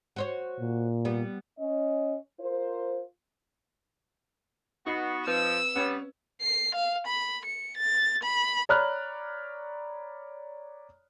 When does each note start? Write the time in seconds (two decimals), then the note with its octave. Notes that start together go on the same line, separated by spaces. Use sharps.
0.16 F#4 C5 C#5
0.60 A#2
1.05 G3 B3
1.59 C#4 D#5
2.40 F4 A#4 C5
4.86 B3 D#4 F#4 C7
5.27 F3 C4 B4 E6
5.76 G3 B3 C#4 C#5
6.42 C7
6.75 F5
7.07 B5
7.45 C#7
7.77 A6
8.23 B5
8.69 C#5 D5 A#5 B5 F6 F#6